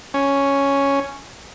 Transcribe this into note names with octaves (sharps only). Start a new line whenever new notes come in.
C#4